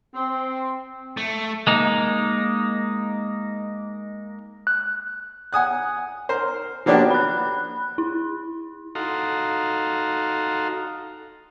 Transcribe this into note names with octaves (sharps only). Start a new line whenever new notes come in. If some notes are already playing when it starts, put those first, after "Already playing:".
C4
A3
G#3 A#3 D#4
F#6
F#5 G#5 D#6 F#6
A#4 C5
F3 A#3 B3 D4 F#4 G4
B5 F#6
E4
D#4 F#4 A4 F5 A#5 C6